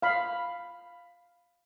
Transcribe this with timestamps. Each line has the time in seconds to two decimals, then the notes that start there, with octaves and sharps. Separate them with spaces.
0.02 F5 B5